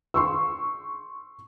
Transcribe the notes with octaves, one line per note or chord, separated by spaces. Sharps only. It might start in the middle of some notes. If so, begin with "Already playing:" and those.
C6 C#6 E6